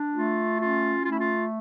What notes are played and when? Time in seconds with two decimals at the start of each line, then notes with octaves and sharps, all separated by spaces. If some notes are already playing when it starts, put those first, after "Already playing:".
Already playing: D4
0.13 A3 F4
0.58 C#4 F4
1.03 A3 F4
1.10 E4
1.19 F4